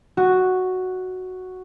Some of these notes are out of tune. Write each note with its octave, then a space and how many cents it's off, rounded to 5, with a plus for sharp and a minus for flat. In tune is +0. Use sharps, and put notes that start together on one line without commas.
F#4 +0 D#5 +0